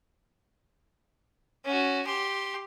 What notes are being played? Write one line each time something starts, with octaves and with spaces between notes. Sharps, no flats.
C#4 F#4
G4 C6